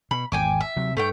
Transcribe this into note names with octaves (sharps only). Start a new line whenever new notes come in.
B2 B5
G#1 E2 G5 G#5 D6
E5
C3 F#3
G2 A3 C#5 G5